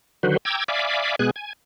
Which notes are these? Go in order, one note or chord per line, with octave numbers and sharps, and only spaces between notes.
D3 D#3 F#3 F#4 B4 C5
G5 A#5 D6 E6 G#6
D5 E5 F5 G#5 B5 D6
B2 G#3 B3 G#4 G#5 F#6
G#5